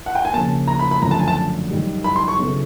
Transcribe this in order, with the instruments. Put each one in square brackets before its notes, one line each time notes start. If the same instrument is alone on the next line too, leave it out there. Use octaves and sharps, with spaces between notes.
[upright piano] F#5
G5
G#5
[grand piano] C#3 F3 A#3 [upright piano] A5
[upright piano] A#5
B5
B5
[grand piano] F#2 D3 F3 A3 [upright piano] A#5
[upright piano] A5
G#5
A5
[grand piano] F#2 D#3 G3
[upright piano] B5
C6
C#6
[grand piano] C#3 F#3 B3 E4 A4